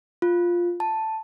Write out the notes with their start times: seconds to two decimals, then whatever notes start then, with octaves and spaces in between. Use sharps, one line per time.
0.22 F4
0.80 A5